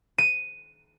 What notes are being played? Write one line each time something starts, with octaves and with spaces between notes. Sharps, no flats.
D#7